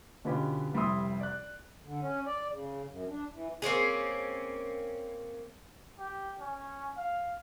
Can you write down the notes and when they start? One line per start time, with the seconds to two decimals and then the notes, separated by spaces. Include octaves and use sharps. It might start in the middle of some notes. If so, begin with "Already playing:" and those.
0.24 B2 D3 B3 C#4 F4 G4
0.74 F1 G3 E4 C6 D#6
1.20 D5 F#6
1.85 D3
2.01 C#4
2.26 D5
2.52 C#3
2.89 F#2
3.08 D4
3.33 E3
3.62 A#3 C4 C#4 G#4
5.99 G4
6.41 C#4
6.97 F5